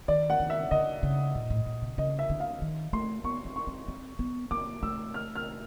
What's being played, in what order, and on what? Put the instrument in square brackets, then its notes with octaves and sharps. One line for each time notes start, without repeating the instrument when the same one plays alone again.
[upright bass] D#3 [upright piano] D5
[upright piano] F#5
[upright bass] D#3
[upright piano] E5
[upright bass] D3 [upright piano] D#5
[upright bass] C#3
A#2
A2
A#2
C3
[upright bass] C#3 [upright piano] D#5
[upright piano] E5
[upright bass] D3
[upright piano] F5
[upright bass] D#3
[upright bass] A3 [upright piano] C6
[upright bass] B3 [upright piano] C#6
[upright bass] C4
[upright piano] C#6
[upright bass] C4
C4
B3
[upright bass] A#3 [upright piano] D6
[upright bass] A3 [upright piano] E6
[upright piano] F6
F6